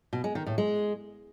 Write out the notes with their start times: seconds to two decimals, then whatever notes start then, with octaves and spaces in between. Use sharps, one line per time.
0.13 B2
0.24 G#3
0.35 D#3
0.46 A2
0.58 G#3